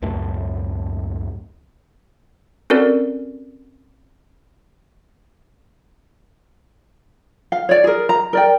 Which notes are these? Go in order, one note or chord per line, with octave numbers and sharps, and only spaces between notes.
C#2 F#2 A2 A3
C4 C#4 F#4 A4 A#4 D5
F5
C#5 D5
G#4 A#4
A#5
A#4 D5 G5